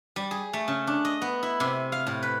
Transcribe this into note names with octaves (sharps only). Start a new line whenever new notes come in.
G3
G#4
A3
C#3
D4
D#5
B3
E4
C3
F5
A2
B4